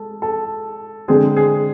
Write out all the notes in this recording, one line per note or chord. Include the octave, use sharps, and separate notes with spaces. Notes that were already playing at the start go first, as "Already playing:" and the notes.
Already playing: G#3 A4
A4
D3 G#3 C4 G#4
G#4